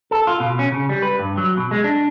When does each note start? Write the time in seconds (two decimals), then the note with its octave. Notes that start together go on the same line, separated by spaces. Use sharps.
0.11 A4
0.27 F4
0.40 B2
0.59 C#4
0.72 C#3
0.89 G3
1.02 B4
1.19 G2
1.37 F#3
1.57 B2
1.71 G#3
1.84 D4